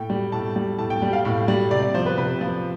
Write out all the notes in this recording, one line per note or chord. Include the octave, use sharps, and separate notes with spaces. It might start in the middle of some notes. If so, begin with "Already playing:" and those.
Already playing: A2 G5
G3
A2 A5
G3
A2 A5
G5
G3 G5
F5
A2
G3
C3 D5
D5
F3 C5
B4
C3 B4
F3